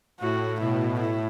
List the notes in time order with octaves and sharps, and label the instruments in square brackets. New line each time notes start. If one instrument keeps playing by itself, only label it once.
[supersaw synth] A2 [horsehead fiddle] F#4
[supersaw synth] B2 [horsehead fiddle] E4
[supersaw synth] A2 [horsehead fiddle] E4